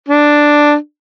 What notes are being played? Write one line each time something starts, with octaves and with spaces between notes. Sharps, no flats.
D4